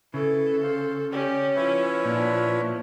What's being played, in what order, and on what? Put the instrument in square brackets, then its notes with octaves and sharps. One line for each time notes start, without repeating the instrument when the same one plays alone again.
[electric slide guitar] C#3 [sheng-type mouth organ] E4 B4 [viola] A4
[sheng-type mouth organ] C5 F5
[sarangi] C#4 [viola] G4 [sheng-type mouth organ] D5
[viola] F3 E4 [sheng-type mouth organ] B4 C#5 E5
[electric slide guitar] A#2 [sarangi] D4